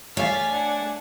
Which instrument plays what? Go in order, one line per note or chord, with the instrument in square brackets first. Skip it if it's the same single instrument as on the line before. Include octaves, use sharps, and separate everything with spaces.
[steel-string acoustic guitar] A3 [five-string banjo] C#5 D5 F5 [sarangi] G#5 [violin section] F6 A6 B6
[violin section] D4 F#5